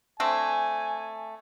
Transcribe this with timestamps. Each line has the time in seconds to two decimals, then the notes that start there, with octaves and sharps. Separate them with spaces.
0.20 A3 C4 D4 G#5